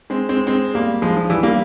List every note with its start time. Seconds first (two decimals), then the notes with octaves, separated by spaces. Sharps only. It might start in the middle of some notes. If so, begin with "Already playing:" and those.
0.10 G#3 C4
0.29 G#3 C4
0.47 G#3 C4
0.74 G3 A#3
1.02 F3 G#3
1.17 F3
1.30 E3 G3
1.43 G3 A#3